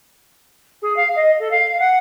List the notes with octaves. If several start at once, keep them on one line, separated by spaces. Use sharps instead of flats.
G#4
F5
D#5
A4
F5
F#5